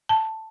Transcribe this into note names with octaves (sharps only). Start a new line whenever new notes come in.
A5